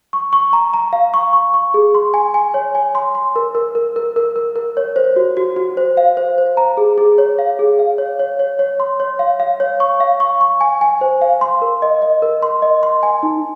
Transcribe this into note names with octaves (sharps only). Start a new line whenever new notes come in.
C#6
C#6
A#5
A#5
F5
C#6
C#6
C#6
G#4
C6
G#5
G#5
C#5
G#5
C6
C6
A#4
A#4
A#4
A#4
A#4
A#4
A#4
C#5
C5
F#4
F#4
F#4
C5
F5
C5
C5
A#5
G#4
G#4
C#5
F5
G#4
F5
C#5
C#5
C#5
C#5
C6
C#5
F5
F5
C#5
C#6
F5
C#6
C#6
G#5
G#5
C5
F5
C6
A#4
D#5
D#5
A#4
C6
D#5
C6
G#5
D#4